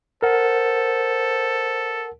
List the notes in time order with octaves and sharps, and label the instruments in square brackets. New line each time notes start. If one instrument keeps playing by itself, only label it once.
[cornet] A4 [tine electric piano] A#4 F#5 [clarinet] C5